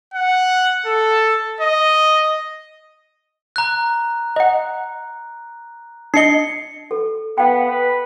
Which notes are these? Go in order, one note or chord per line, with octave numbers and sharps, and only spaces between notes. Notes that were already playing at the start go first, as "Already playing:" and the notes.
F#5
A4
D#5
A#5 F#6
D#5 F#5
D4 D#5 C7 C#7 G7
A4
B3 F5 G5
B4